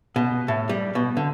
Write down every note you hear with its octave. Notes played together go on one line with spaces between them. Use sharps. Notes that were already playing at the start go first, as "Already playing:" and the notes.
B2
A2
G3
B2
D3